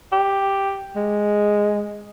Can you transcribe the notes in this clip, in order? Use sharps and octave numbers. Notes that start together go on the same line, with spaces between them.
G4
G#3